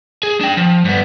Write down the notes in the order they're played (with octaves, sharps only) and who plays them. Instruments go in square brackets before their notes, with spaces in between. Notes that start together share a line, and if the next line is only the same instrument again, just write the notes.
[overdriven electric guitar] G#4
D4 G5
F3
G2 B3